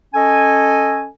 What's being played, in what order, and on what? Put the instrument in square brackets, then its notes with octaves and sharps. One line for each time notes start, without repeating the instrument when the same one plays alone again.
[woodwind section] C#4 A4 D#5 G#5